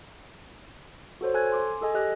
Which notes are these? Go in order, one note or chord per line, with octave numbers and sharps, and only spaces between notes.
F#4 A4 C5 C#5
A4 G#5 F#6 G#6
G#5 C6 D6
G#4 A4 D#5 G#5
G4 D#5 F#6